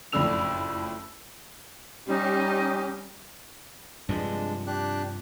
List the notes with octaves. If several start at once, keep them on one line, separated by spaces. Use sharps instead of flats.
F#1 F2 A2 D4 E6 F7
G3 C#4 D#4 G4 D#5 C6
G2 C3 F3 G#3 D4
D4 G4 F#6